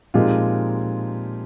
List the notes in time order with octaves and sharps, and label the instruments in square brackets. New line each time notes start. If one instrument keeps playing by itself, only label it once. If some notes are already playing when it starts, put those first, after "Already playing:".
[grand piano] A#2 F3 G#3 C4 D#4 F4 G4